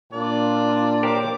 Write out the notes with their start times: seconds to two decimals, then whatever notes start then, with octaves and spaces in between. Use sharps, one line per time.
0.13 A#2 D4 F4 D5
1.03 G4 A#4 C5 C#5 D6